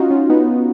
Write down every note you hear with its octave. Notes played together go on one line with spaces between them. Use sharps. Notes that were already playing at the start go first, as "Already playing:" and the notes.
Already playing: C#4 D#4 F4 F#4
C#4 F4
B3 D#4